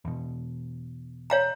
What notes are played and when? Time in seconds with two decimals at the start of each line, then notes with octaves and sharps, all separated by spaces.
0.05 E2 B2
1.30 C#5 F5 A#5